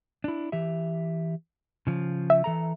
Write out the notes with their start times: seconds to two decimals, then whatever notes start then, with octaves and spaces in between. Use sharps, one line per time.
0.24 D4 E4
0.52 E3 G4 E5
1.87 C#3 F3
2.30 E5
2.44 E3 A4 A#5